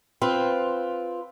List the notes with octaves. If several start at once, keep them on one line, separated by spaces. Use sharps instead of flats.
C4 F4 B4